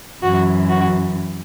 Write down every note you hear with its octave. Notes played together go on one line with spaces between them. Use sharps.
F#2 E3 F#4
F#4